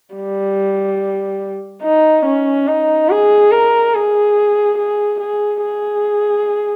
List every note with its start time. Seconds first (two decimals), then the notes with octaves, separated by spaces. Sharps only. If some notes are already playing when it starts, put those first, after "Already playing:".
0.15 G3
1.83 D#4
2.25 C#4
2.68 D#4
3.10 G#4
3.52 A#4
3.94 G#4
4.78 G#4
5.20 G#4
5.63 G#4